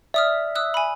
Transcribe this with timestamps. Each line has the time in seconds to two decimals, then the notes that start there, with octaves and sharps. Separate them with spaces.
0.14 D5 E5 D#6 F6
0.55 D#6 E6 F#6
0.74 G#5 B5